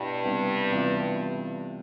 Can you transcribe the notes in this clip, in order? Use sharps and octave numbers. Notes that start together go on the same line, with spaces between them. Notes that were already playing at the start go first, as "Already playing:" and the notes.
Already playing: G2 B2 B3 E4 G4
C3 G3 B3 E4 G4
C3 E3 G3 B3 F4